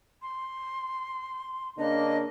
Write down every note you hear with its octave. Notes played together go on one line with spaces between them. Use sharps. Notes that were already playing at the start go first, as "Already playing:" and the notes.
C6
C#3 A#3 D4 D#5